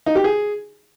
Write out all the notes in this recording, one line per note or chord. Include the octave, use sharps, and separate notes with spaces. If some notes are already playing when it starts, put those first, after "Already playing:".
D#4
G4
G#4